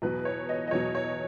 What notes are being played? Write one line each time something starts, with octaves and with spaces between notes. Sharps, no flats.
E2 B2 F#3 B4
C#5
D#5
D#5
E2 B2 F#3 C#5
C#5